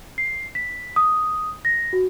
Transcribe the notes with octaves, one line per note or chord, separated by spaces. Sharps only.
C7
B6
D#6
A#6
F#4